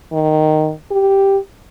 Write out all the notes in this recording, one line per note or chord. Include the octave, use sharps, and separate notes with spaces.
D#3
G4